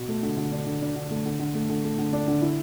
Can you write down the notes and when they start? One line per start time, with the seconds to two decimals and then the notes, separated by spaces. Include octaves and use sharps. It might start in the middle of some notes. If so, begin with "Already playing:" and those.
Already playing: B2
0.08 A3
0.23 D3
0.37 D3
0.52 D4
0.66 D3
0.82 D4
0.96 D3
1.11 A3
1.25 D3
1.39 D3
1.55 A3
1.69 D3
1.84 A3
1.98 D3
2.13 D4
2.28 D3
2.42 E4